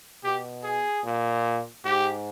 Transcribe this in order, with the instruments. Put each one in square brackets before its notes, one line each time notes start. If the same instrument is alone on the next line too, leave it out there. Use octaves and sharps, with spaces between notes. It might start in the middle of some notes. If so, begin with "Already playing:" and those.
[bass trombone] B2 [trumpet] G4
[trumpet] G#4
[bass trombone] A#2
[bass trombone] G#2 [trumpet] G4